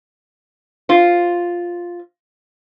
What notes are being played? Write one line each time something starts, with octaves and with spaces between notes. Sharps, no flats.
F4 C5